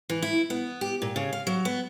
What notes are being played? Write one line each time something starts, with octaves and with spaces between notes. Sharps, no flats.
E3
E4
B3
G4
A#2
C#3
F5
F#3
B3